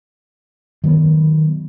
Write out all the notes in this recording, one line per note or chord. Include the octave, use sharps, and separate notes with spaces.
D#3 F#3 A#3 B3